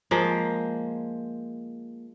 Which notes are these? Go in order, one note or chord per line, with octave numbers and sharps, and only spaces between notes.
F3 G#3 A#3